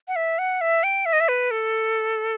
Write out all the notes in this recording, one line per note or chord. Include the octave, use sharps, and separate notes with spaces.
F#5
E5
F#5
E5
G5
E5
D#5
E5
B4
A4